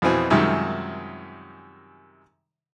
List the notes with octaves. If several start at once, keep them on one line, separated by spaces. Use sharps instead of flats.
F2 B2 E3 C4 G#5
F#2 C3 D#3 F3 G3 G#3